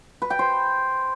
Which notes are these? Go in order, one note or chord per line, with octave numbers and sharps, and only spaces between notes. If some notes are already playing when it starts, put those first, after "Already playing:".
B4
G5
C5